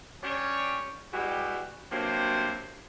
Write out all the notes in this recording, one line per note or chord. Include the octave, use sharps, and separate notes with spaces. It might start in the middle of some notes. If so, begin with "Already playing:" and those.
G3 C#4 D4 G4 C#5
E3 G3 G#3 F#4 G4
G2 C3 F#3 A#3 C5